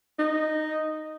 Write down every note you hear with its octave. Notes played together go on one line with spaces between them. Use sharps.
D#4